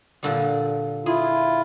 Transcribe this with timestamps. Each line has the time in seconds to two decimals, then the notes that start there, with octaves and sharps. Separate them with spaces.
0.23 A#2 D3 G3
1.06 E4 F4 G#4